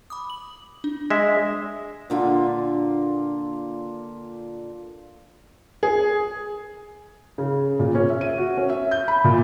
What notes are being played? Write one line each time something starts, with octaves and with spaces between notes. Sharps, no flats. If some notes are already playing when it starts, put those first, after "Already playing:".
B5 D6 D#6
F#7
D4
G#3 E5
A#2 D3 F4
G#4
C#3
A#2
C#4
E5
D#7
F#4
C#4
E5
G6
B5
A#2